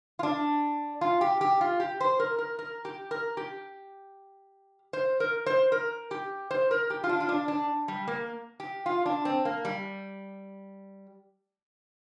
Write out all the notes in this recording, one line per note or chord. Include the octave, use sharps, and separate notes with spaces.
F4
D4
F4
G4
G4
F4
G4
C5
A#4
A#4
A#4
G4
A#4
G4
C5
A#4
C5
A#4
G4
C5
A#4
G4
F4
D4
F4
D4
D4
G3
A#3
G4
F4
D4
C4
A#3
G3